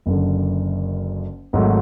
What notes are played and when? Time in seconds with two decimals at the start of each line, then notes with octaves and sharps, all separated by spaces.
0.06 F#1 F#2 D3
1.53 G#1 G#2 F#3 A3